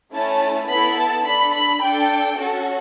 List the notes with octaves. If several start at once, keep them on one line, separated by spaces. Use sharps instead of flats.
A3 C#4 E4 A5
B3 E4 A4 B5
A5
D4 A4 B5
B5
D4 G5
A4
C#4 F#4 A4